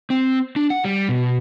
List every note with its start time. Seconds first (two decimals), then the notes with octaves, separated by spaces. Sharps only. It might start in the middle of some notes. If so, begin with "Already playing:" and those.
0.10 C4
0.56 D4
0.70 F#5
0.85 G3
1.09 B2